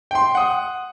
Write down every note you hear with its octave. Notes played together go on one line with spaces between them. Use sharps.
G5 C6
F#5 D#6